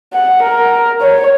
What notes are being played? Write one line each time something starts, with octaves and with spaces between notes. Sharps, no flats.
F#5
A#4
C#5